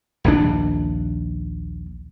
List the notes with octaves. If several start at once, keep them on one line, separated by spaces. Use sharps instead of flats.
A#1 D#2 F3 D4